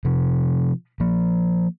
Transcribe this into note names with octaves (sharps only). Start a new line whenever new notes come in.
C3 F3
F3 A#3